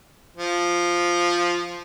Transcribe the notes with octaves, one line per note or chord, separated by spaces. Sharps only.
F3